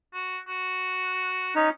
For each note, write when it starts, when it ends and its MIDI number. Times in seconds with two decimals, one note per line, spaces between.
0.14 0.38 66
0.48 1.52 66
1.55 1.69 61
1.55 1.69 63